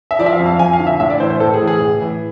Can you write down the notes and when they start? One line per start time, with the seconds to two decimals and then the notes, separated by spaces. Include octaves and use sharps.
0.11 E5
0.19 F3 D5
0.26 E5
0.33 F5
0.39 F2
0.46 F5
0.59 F2 G#5
0.73 F5
0.80 D3
0.87 E5
1.00 A2 E5
1.10 D5
1.20 E3 C5
1.30 C5
1.40 A2 A4
1.54 G#4
1.61 E3
1.67 G#4
1.81 A2
2.01 E3